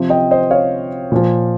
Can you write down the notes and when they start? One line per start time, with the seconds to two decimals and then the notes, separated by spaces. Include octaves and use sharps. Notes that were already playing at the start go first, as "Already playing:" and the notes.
Already playing: C3 F3
0.10 D#5 G5
0.31 C5 D#5
0.51 C#5 F5
1.12 A#2 F3